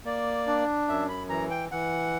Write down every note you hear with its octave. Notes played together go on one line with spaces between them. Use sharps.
A#3 D5
D4
F#2 E5
B5
E3 A#5
G5
E3 F#5